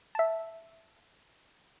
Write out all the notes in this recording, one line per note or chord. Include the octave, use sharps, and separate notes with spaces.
E5 A5